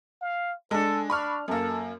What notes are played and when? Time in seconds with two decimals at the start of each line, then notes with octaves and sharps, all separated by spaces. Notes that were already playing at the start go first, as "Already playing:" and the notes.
0.21 F5
0.71 G#3 D4 A4
1.10 D4 B5 C#6 F6
1.48 F#2 A#3 A4